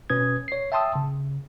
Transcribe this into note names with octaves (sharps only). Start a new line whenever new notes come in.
B2 C#4 B4 D#6 G#6
C#5 C7
E5 G5 A5 C6 D#6 E6
C#3